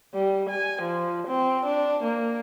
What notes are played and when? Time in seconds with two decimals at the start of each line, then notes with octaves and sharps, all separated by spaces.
0.14 G3
0.50 G#5
0.82 F3
1.27 C4
1.66 D4
2.04 A#3